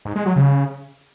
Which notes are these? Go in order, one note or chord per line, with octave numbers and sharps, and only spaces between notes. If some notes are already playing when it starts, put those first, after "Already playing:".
G#2
G#3
F#3
C#3